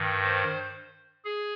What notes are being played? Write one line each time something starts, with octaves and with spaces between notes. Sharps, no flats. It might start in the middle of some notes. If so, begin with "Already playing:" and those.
Already playing: G2 D#3
C5
G#4